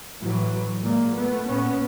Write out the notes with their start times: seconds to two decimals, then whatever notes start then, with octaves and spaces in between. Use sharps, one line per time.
0.22 A2 E3 F#3
0.84 A#2 G#3 A#3
1.16 A3 B3
1.47 A#2 B3 C#4